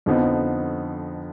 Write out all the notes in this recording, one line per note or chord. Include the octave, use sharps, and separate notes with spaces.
F2 D3 F3 B3 D#4